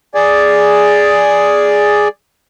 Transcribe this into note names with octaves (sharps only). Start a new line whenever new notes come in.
G#4 D5